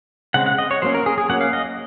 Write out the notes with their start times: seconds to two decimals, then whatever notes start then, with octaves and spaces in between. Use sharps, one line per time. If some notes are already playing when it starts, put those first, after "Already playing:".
0.34 C#3 G#3 C4 F#5
0.46 F#5
0.58 D#5
0.71 C#5
0.82 F#3 A#3 C#4 C5
0.94 A#4
1.06 G#4
1.18 G#4
1.30 F#3 A#3 C#4 F#5
1.41 F5
1.53 D#5